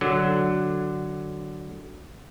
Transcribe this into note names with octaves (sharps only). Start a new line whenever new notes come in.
D3 F#3